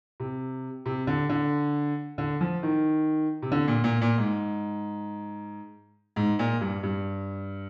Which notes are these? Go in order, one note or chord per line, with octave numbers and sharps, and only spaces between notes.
C3
C3
D3
D3
D3
F3
D#3
C3
D3
A#2
A#2
A#2
G#2
G#2
A#2
G2
G2